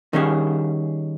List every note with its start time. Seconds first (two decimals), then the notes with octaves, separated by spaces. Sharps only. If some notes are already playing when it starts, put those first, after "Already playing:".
0.13 D#3 G3 C#4 G#4